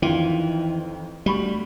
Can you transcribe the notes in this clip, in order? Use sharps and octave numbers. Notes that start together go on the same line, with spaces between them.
F2 D#3 E3 F4
D2 G3 B5 C#6